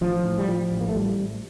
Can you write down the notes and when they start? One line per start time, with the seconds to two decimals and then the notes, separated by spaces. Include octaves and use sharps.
0.01 A1 F3
0.24 A2
0.38 G3
0.48 A2 F3
0.72 A1
0.81 A#3
0.88 A3
0.96 A2 G3
1.19 A2